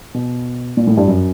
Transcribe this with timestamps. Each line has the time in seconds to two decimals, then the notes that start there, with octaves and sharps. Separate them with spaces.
0.14 B2
0.77 A#2
0.87 A2
0.97 G2
1.08 F#2